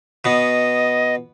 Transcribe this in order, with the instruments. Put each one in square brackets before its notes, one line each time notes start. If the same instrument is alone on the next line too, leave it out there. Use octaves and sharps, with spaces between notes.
[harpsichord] B2 B3 [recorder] D#5